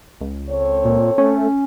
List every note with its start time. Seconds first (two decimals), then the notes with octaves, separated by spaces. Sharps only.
0.21 C#2
0.50 C4 A4 C#5
0.84 A#2
1.18 A3 C#4